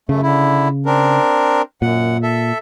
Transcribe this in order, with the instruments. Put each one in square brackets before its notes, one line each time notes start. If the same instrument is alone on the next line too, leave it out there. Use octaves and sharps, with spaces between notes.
[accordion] F#2 A3 [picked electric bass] C#3
[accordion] D3 E4
C4 D4 A#4
[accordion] F#2 F#5 [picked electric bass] A#2
[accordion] A4 E5